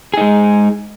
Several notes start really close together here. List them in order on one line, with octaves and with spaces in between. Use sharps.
G#4 D#4 G#3